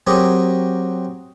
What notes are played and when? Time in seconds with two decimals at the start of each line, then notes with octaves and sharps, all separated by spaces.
0.07 F#3 C4 G4 G#4 A#4